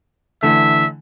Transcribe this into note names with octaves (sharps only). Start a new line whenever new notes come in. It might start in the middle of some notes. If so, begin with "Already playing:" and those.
D3 E3 A3 E5